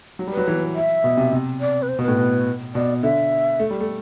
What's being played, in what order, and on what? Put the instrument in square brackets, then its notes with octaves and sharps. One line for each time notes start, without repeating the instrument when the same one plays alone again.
[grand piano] F#3
G3
[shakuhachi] B4
[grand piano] F#3
E3
[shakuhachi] E5
[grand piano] B2
C3
C3
[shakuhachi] D5
B4
C5
[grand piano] B2
[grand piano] A2 [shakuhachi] B4
[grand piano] B2
[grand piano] B2 [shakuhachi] D5
[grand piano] D3 [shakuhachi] E5
[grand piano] A3
G3
A3